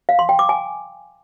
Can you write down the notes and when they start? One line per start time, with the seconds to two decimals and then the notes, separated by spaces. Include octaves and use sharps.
0.09 F5
0.19 C6
0.29 G5
0.39 D6
0.49 G#5